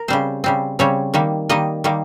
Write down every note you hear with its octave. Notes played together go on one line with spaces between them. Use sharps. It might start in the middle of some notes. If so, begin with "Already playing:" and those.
Already playing: A#4
C#3 G3 C4 C5
C#3 G3 C4
C#3 G3 C4 C#5
D#3 G3 A#3
D#3 G3 A#3 D#5
D#3 G3 A#3